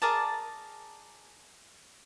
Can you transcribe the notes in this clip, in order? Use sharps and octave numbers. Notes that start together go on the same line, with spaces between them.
G#4 A#4 D5 A5